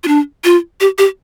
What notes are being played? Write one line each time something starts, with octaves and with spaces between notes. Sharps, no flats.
F4
D4
F4
G4
G4